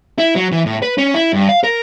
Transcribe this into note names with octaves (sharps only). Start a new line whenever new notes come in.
E4
F#3
E3
A2
B4
C#4
E4
G2
F5
A#4